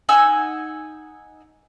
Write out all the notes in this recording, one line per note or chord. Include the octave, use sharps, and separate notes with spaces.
D#4 F#5 G#5 E6